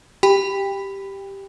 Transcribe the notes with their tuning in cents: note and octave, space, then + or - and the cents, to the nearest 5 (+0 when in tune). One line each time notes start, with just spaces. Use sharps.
G4 +0 G5 +25 B5 +15